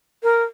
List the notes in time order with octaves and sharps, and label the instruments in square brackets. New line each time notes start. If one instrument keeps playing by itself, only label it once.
[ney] A#4